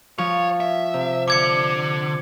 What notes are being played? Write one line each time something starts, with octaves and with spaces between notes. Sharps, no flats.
F3 C#5
E5
C3
D3 D6 G#6 C#7